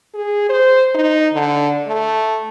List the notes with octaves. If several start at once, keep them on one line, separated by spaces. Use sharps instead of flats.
G#4
C5
D#4
D3
A3